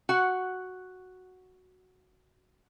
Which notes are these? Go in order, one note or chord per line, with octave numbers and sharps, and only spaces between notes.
F#4 F#5